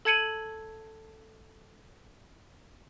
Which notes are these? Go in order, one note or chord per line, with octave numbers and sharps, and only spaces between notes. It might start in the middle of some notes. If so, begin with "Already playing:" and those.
A4 A5 G#6 C#7 D#7 F#7